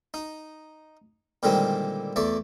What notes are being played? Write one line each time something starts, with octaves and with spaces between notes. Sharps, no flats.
D#4
A#2 D3 D#3 G3 G#3 C4
E2 A3 D5